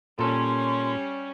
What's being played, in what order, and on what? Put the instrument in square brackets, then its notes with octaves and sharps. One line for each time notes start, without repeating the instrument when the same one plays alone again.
[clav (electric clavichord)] A#2 A4 [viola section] G3 C#4 [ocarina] C6